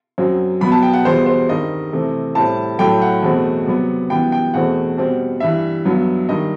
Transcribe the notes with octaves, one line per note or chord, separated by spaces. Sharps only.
F#2 F#3 C4
B2 F#3 B3 B5
A5
G5
F#5
E2 B2 G3 B3 C5
C5
G2 D#3 G3 C4 D#5
C3 E3 A3
A2 G3 C4 A5
A2 F#3 A3 G5
F#5
E2 B2 A3 C4
C3 F#3 B3
F#2 E3 G3 B3 G5
G5
E2 B2 A3 C4 F#5
B2 G3 C4
G2 E3 G3 E5
G2 F#3 B3
G2 D#3 G3 D#5